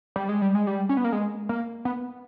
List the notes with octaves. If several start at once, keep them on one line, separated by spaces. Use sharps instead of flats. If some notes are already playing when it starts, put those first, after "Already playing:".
G3
G#3
G3
G#3
G3
C#4
B3
A#3
G#3
A#3
B3